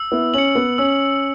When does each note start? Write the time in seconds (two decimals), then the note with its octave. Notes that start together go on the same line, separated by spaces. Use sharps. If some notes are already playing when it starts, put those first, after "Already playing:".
Already playing: E6
0.12 B3 E4
0.34 C#4 C#7 F#7
0.55 B3
0.78 C#4 E6